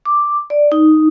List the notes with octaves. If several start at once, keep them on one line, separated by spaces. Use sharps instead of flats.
D6
D5
D#4